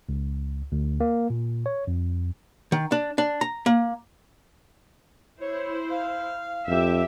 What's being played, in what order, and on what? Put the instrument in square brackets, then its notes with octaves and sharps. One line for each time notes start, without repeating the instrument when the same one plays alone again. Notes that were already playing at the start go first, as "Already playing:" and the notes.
[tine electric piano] C#2
D2
A#3
A#2
C#5
F2
[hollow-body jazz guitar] D#3
D4
D4
A#5
A#3
[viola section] E4 C5 [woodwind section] C#5
[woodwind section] F5
[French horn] F2 [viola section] G4 E5